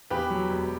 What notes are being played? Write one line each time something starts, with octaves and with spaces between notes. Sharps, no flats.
E2 G4 B4
F#3
E1